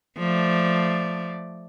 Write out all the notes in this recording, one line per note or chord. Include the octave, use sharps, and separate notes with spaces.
F3 A3 D5